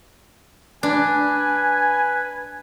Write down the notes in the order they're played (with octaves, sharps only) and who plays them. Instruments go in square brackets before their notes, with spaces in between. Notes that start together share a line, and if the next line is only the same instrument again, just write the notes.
[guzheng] D4 [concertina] B4 [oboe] G#5